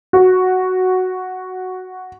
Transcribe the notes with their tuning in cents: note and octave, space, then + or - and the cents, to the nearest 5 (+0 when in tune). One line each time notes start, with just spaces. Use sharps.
F#4 +0